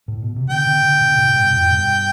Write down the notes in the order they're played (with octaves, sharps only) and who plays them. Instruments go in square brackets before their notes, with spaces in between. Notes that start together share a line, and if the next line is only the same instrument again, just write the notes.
[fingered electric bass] A2
B2
C3
[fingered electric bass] B2 D3 [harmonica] G5
[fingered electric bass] B2 D3
B2 D3
B2 D3
A2 C3
G2 B2
F2 A2
G2 B2